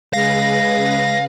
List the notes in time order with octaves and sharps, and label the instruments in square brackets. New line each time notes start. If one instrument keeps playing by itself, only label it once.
[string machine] C#3 G#4 B4 [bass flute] G#3 [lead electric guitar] F5 [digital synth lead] A#6